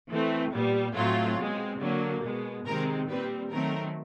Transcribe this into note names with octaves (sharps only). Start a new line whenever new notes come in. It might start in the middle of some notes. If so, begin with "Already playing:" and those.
E3 A3 C4
A#2 G3 B3
A2 F#3 A3 C4 F4
B2 G#3 C4
D3 F#3 A#3
B2 G#3 B3
C3 D#3 G#3 C4 A#4
A#2 G3 C4 B4
D#3 F#3 A3 C4 A#4